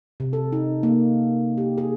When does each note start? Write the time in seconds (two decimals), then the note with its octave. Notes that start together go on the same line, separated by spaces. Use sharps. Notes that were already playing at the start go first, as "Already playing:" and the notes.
0.20 C3
0.33 A4
0.52 D#4
0.83 A#3
1.58 G4
1.78 G#4